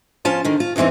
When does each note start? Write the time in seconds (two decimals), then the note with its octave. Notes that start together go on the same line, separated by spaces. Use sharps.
0.25 F3 C#4 F4 A5
0.45 D3 D#3
0.60 F4
0.76 E2 G2 E3 C4 D#4